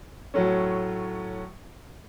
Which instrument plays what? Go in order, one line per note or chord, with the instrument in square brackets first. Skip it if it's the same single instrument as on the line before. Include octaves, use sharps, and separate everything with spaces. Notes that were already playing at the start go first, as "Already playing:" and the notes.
[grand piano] A2 F#3 A3 C#4